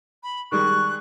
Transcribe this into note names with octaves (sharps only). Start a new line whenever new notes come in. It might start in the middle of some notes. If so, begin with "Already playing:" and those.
B5
D#3 G3 G#3 C#6 F#6